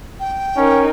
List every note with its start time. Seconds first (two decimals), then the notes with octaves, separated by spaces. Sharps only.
0.20 G5
0.57 C#4 D#4 A#4